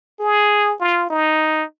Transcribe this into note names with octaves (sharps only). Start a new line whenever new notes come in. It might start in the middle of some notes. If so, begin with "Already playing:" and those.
G#4
F4
D#4